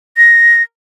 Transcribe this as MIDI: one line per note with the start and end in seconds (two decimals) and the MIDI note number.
0.17 0.63 94